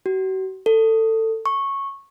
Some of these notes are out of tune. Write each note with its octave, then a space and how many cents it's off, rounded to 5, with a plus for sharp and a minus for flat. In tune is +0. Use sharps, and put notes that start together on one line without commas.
F#4 +40
A4 +20
C#6 -10